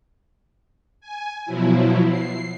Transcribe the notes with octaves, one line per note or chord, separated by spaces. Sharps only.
G#5
B2 F3 F#3 E4
C7